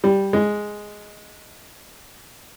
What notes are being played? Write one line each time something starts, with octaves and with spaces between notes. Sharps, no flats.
G3
G#3